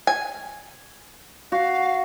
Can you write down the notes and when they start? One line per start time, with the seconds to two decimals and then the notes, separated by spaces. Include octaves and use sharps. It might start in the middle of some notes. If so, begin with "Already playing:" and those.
0.07 G#5
1.52 F#4 F5